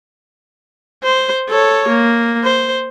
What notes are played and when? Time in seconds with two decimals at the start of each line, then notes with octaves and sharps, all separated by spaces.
1.03 C5
1.49 A4 C#5
1.88 A#3
2.44 C5